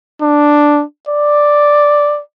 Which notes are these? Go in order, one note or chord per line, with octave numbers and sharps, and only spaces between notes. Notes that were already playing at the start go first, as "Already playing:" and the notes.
D4
D5